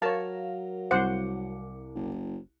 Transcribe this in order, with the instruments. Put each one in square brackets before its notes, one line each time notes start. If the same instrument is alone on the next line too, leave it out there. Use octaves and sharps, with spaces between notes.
[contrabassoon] F#3 [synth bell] A#4 F5 [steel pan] C#5 A5
[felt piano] C2 D6 C#7 [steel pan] C5 F#5
[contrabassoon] F#1